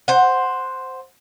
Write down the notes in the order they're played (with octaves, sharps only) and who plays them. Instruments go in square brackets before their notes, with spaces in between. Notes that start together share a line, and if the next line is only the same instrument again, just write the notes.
[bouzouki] C5 F#5